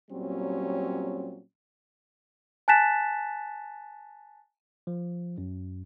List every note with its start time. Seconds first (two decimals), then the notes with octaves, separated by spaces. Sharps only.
0.10 A#2 F#3 G3 C4 C#4
2.68 G#5 A5 F#6 A6 B6 E7
4.87 F3
5.38 F#2